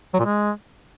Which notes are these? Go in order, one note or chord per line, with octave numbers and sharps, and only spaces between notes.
F#3
A#2
G#3